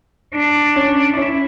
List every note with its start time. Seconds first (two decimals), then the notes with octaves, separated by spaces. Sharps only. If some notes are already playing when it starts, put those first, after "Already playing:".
0.35 D4
0.76 C#4
1.17 C#4 E4